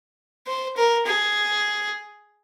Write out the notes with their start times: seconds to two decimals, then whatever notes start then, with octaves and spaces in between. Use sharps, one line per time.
0.47 C5
0.76 A#4
1.06 G#4